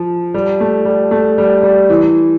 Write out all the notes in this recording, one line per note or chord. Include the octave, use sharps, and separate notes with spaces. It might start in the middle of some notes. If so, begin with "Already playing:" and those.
Already playing: F3
G3
A3
G3
A3
G3
G3
E3